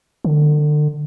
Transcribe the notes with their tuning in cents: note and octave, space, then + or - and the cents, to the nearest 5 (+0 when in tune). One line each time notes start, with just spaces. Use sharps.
D3 +30